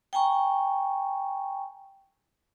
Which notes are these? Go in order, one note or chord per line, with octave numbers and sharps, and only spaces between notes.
G5 G#5 A#5 C#6